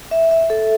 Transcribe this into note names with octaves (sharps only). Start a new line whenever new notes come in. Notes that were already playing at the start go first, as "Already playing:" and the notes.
E5
E5
A4